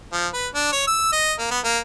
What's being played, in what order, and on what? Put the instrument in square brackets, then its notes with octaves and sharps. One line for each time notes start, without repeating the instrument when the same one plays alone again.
[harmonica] F3
B4
D4
C#5
E6
D#5
A#3
B3
A#3